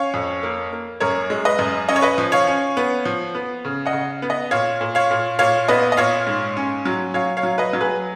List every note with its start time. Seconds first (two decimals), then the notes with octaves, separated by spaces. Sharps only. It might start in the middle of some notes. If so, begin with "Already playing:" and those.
Already playing: C#4 C#5 F5
0.14 F2
0.43 A#3
0.72 A#3
1.00 F#2 A#4 C#5
1.30 G#3
1.45 B4 D#5
1.59 F#2
1.89 C#4 D#5
1.96 C#5
2.02 B4 D#5
2.18 F3
2.32 C#5 F5
2.47 C#4
2.77 B3
3.06 F3
3.35 B3
3.65 C#3
3.85 D#5 F#5
3.93 C#3
4.22 B3
4.30 B4 D#5
4.51 A#2 C#5 F5
4.81 A#2
4.95 C#5 F5
5.11 A#2
5.39 A#2 C#5 F5
5.68 B3 B4 D#5
5.92 D#5
5.97 A#2 C#5 F5
6.27 G#2
6.57 C#4
6.85 F#3
7.14 F#3 C#5 F5
7.37 C#5 F5
7.43 F#3
7.58 B4 D#5
7.73 F#3
7.81 G#4 B4